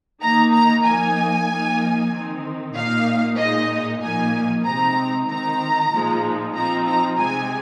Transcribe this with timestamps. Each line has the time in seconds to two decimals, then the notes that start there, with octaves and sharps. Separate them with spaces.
0.21 D#3 A#3 D#4 A#5
0.53 A#5
0.85 F3 A#3 D#4 G#5
1.48 F3 A#3 D#4
2.12 D#3 C4 D#4
2.74 A#2 A#3 D#4 F5
3.38 A#2 G#3 D#4 D#5
4.02 A#2 F3 A#3 D#4 G#5
4.65 C3 G#3 C4 D#4 A#5
5.28 D#3 C4 D#4 A#5
5.91 A#2 F3 G#3 D#4
6.55 F3 C4 D#4 A#5
6.87 A#5
7.18 C3 G#3 C4 D#4 G#5